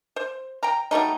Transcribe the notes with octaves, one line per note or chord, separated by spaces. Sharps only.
C5
G5 A#5
F#3 G3 A3 D#4